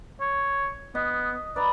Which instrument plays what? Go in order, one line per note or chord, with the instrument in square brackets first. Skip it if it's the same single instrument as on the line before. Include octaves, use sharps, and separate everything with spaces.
[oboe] C#5
[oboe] B3 [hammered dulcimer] D#5
[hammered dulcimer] B4 A#5 B5 [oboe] D5